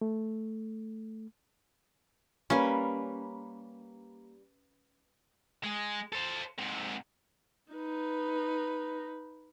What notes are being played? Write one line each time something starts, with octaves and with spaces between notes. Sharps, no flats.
A3
G3 A#3 C#4 B4
G#3
A4 C5
G#2 C3
D#4 B4